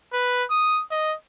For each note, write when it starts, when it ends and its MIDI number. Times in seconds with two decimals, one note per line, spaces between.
0.13 0.43 71
0.51 0.82 87
0.91 1.15 75